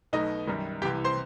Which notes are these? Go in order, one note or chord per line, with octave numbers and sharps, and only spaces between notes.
B1 B2 A3 D#4 D#5
F#2 D#3 G3
C2 C3 E3 G4 G5
C5 C6